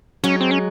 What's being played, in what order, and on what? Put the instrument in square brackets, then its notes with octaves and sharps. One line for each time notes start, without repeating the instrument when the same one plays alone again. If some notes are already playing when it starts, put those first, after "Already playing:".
[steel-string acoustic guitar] F#3 G#3 [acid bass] C#4
[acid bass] C4
C#4